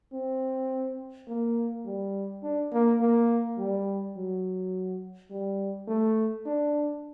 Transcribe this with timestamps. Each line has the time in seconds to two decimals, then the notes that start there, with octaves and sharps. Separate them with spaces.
0.13 C4
1.28 A#3
1.86 G3
2.43 D4
2.73 A#3
3.01 A#3
3.58 G3
4.16 F#3
5.30 G3
5.88 A3
6.46 D4